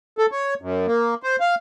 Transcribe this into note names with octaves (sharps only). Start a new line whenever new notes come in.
A4
C#5
F#2
A#3
C5
F5